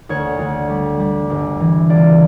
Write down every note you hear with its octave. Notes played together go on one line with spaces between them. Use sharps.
D2 C#5
D2
G3
G3
G1
E3
C#2 D5